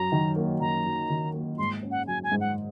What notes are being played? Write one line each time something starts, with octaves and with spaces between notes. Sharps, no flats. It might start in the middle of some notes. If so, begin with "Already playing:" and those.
Already playing: F#2 F#3 A#5
D#3
A#3
F#2 A#5
F#3
D#3
A#3
G#2 C6
C#4
F#5
F#3 G#5
G#5
G#2
F#5